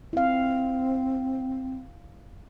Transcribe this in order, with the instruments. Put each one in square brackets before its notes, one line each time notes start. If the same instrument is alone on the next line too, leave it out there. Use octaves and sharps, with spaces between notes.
[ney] C4 [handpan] E4 F5